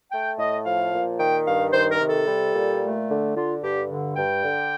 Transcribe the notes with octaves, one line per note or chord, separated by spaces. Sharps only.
A3 G5
A2 D#5
F3 F5
A#2
D#3 G5
G2 F5
D#3 C5
A#4
C3
A4
G3
A#2
A3
D3
D3 F4
G2 G4
D3
G2 G5
D3